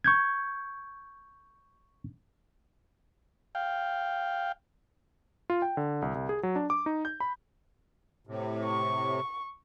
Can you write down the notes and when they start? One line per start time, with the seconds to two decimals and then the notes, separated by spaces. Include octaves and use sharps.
0.04 C#6 G6 G#6
3.55 F5 G5
5.50 F4
5.62 G5
5.77 D3
6.02 C2
6.15 C2
6.29 G#4
6.43 F#3
6.56 D4
6.70 D6
6.86 D#4
7.05 G6
7.20 B5
8.27 A2 C3
8.64 C#6